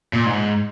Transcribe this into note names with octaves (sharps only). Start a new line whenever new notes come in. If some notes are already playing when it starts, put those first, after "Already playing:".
A#2
G#2